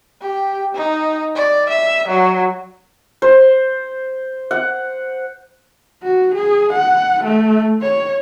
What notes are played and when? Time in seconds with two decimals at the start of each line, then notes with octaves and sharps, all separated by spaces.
0.22 G4
0.75 D#4
1.36 D5
1.70 E5
2.08 F#3
3.22 C5
4.51 F#5
6.03 F#4
6.35 G#4
6.73 F#5
7.25 A3
7.82 C#5